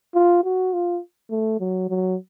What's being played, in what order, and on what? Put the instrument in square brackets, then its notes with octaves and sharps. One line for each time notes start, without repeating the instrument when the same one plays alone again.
[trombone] F4
F#4
F4
A3
F#3
F#3